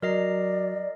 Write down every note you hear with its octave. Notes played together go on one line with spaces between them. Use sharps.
F#3 A#4 D5 D#5 C7